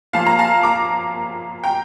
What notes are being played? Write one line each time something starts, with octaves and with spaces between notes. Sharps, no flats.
A#2 F3 A#3 F5 A5
A#5
F5 A5
A#5 D6
G5 A#5